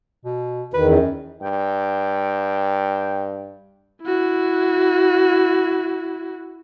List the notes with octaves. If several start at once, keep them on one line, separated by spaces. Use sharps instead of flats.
B2
E2 D#3 B4
F#2
G2 G5
E4 F#4